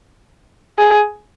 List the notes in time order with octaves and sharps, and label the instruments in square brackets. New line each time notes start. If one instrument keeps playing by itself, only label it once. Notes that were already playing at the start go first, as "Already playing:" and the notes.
[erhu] G#4